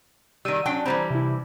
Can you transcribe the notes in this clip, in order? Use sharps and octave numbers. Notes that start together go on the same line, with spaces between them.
D#3 G3 E6 D#7
F#3 C#4 D4 G5
E3 G3 C4 C5 A#5 B5
C3 E4